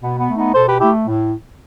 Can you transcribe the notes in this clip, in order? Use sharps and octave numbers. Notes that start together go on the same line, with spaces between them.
B2 B3
B3
A3
B3 D#4
B2 A4 C5
G4 B4
A3 E4 G4
A2